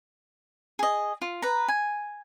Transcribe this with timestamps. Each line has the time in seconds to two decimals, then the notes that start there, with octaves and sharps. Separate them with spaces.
0.79 G#4 D#5
1.22 F4
1.42 B4 A#5
1.68 G#5